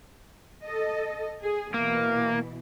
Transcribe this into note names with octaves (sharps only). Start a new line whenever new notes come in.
A4 D#5
G#4
B2 E3 A#3